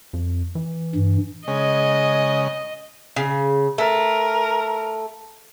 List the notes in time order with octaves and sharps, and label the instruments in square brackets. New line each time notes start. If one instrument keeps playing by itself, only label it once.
[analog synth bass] F2
E3
[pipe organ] G2
[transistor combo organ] C#3 G#3 [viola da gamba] D#5
[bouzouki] C#3
[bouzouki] A3 [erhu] A#4